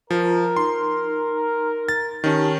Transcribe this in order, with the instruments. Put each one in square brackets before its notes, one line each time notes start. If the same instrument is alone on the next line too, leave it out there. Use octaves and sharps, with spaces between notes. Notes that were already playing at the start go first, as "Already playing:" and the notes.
[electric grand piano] F3 [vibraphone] F4 [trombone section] A#4
[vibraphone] D#4 [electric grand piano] C6
[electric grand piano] A6
[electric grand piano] D#3 C#4 [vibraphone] D#4 G4 A5